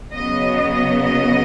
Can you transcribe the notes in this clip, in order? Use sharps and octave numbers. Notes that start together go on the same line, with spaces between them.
C#3 F#3 B3 D#5
D#5
D#5